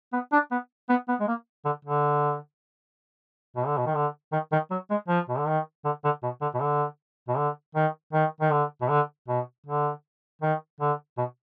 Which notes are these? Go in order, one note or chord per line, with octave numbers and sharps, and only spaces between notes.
B3
D4
B3
B3
B3
G#3
A#3
D3
D3
B2
D3
B2
D#3
D3
D#3
D#3
F#3
G#3
F3
B2
D3
D#3
D3
D3
B2
D3
B2
D3
B2
D3
D#3
D#3
D#3
D3
B2
D3
B2
D3
D#3
D3
B2